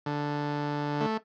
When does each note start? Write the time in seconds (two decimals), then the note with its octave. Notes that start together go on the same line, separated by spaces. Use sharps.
0.06 D3
1.01 A3